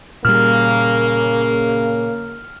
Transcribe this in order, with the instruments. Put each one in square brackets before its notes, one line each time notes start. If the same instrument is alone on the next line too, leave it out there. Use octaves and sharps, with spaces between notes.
[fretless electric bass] A#2 G3 [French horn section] C#3 A#3 [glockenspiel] F6